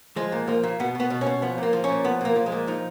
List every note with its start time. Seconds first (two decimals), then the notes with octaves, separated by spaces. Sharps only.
0.16 F3 G#3
0.32 A#2
0.48 F3 A#3
0.63 A#2
0.80 B2 B3
0.95 B2 B3
1.10 B2
1.21 C#4
1.26 B2
1.42 F3 B3
1.58 A#2 A#3
1.73 F3
1.84 C#4
1.89 A#2
2.04 F3 B3
2.21 A#2 A#3
2.36 F3
2.46 G#3
2.52 A#2
2.67 F3 D#4